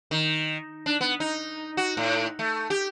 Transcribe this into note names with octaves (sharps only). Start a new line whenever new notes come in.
D#3
D4
B3
D#4
F#4
A2
A3
G4